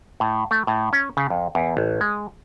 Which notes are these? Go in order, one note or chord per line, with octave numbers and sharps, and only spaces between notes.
A2
A3
A2
C#4
C#3
F2
E2
A1
G#3